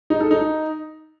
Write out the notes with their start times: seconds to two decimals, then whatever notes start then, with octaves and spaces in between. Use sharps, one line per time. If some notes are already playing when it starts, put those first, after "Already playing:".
0.10 D#4
0.20 A4
0.31 D#4